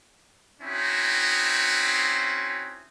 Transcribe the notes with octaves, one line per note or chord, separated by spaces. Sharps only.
C4 C#4 D#4 E4 F#4